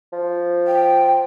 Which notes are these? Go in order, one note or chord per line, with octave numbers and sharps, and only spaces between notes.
F3
G5